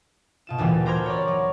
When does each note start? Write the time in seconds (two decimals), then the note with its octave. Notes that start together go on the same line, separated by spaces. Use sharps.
0.47 B2 F4 E7
0.58 D2 A#2 E3 G3
0.86 C5 A#5 B5 D6 F6 G#6
1.06 C#5 D5
1.28 F#3